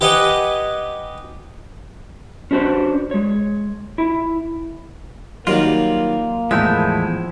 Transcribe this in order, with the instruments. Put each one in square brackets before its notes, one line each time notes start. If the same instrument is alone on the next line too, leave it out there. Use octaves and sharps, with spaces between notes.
[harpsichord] G4 B4 D#5 F#5 G#5
[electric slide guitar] C#4 D4 F#4 B4 C5
G#3 C#5
E4
[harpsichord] D#3 F#3 G3 [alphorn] A#3 [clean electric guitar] F4
[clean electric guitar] E2 A2 G#3 [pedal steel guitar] F3 E4 G6 [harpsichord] E5